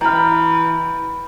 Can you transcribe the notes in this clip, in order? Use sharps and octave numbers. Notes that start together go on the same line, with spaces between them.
E3 G5 A#5 B5 F6